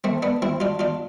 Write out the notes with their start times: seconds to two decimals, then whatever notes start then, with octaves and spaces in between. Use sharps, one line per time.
0.04 A3 C4
0.22 B3 D4
0.42 C4 E4
0.60 D4 F4
0.79 D4 F4